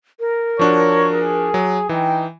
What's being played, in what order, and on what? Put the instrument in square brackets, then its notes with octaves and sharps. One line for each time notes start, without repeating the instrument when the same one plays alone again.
[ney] A#4
[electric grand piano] F3 D4 F#4 [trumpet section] C#5
[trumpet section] G#4
[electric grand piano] F#3
[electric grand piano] E3 [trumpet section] D#4 G5